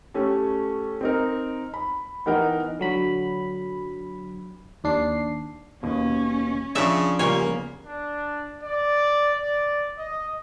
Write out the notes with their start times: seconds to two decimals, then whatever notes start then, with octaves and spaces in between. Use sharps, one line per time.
0.14 A3 C#4 G4 A4
1.01 C4 D#4 A#4
1.74 B5
2.26 E3 B3 D#4 A#4 F#5 G5
2.79 D3 F#3 B5
4.84 D#2 D4 C7
5.83 D#2 B2 C#4
6.75 C#3 F3 D4 E5
7.19 C#3 G3 A#3 B3 C#4 F4 C#5 G#5
7.84 D4
8.63 D5
9.34 D5
9.98 D#5